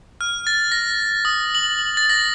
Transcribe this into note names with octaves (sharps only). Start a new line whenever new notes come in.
F6
A6
A#6
D#6
F#7
A6
A#6